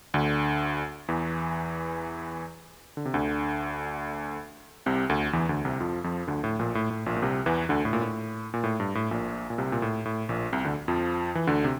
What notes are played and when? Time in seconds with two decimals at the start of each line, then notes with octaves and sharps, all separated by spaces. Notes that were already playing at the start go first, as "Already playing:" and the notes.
0.14 D2 D3
1.09 E2 E3
2.97 D3
3.05 C3
3.14 D2 D3
4.86 C2 C3
5.09 D2 D3
5.33 E2 E3
5.49 D2 D3
5.65 C2 C3
5.80 F2 F3
6.04 F2 F3
6.28 D2 D3
6.44 A2
6.59 A#1 A#2
6.75 A2
6.90 A2
7.06 A#1 A#2
7.16 A#2
7.22 C2 C3
7.46 E2 E3
7.69 D2 D3
7.85 A2
7.93 A#2
8.01 A2
8.54 A#2
8.64 A2
8.80 G2
8.95 A2
9.11 A#1 A#2
9.50 A#2
9.58 C2 C3
9.72 A#2
9.82 A2
10.05 A2
10.29 A#1 A#2
10.53 C2 C3
10.64 D2 D3
10.88 F2 F3
11.35 E3
11.47 D2 D3
11.64 C3